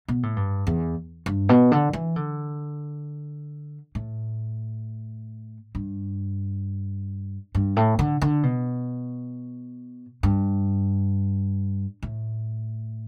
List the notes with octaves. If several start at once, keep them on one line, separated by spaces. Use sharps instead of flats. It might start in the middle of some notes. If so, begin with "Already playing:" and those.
B2
A2
G2
E2
G2
B2
D3
E3
D3
A2
G2
G2
A2
D3
D3
B2
G2
A2